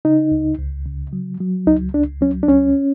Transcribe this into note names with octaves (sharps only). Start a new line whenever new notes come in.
C#3 D#4
C#2
C#2
C#3
F#3
F#3
C#2 D#4
C#2 D4
F#3 C#4
D4
C#2 C#4